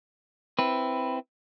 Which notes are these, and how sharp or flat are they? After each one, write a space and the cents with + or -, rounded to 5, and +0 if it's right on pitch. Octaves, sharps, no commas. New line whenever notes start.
C4 +0 E4 +0 B4 +0